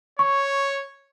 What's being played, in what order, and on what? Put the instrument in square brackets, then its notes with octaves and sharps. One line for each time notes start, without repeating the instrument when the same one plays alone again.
[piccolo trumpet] C#5 [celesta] C#6